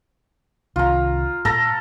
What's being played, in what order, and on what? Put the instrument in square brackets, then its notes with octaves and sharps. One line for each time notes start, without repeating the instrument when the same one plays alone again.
[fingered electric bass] C2 D#3 C#4 [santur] F4 A#5
[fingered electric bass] A#2 G#3 [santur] A4 A#5